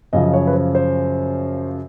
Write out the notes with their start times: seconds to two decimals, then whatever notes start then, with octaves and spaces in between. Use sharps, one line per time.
0.13 F#2 C#3 F3 D#5
0.33 C#5
0.47 B4
0.53 C5
0.75 C5